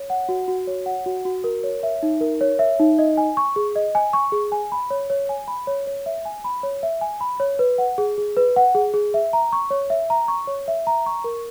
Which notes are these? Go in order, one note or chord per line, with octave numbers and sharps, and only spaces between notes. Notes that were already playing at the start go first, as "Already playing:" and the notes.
Already playing: C#5
F#5
F#4
F#4
C#5
F#5
F#4
F#4
A#4
C#5
E5
D#4
A#4
C#5
E5
D#4
D#5
G#5
C#6
G#4
D#5
G#5
C#6
G#4
G#5
B5
C#5
C#5
G#5
B5
C#5
C#5
E5
G#5
B5
C#5
E5
G#5
B5
C#5
B4
F#5
G#4
G#4
B4
F#5
G#4
G#4
E5
A#5
C#6
C#5
E5
A#5
C#6
C#5
E5
A#5
C#6
A#4